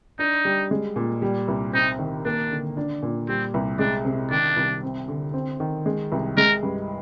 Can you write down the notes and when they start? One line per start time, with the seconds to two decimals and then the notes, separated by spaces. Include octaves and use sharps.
0.19 D4 D#4
0.45 G3
0.71 G#3
0.96 A#2
1.22 G3
1.48 C2
1.73 C4 D#4
1.99 D#3
2.25 A#3 D4
2.51 D3
2.77 D4
3.02 A#2
3.28 G3 C4
3.54 C2
3.79 G#3 D4
4.05 C3
4.31 D#3 D4
4.56 C2
4.83 C4
5.08 D3
5.34 C4
5.60 D#3
5.86 G#3
6.12 C2
6.37 G#3 A#4
6.63 G2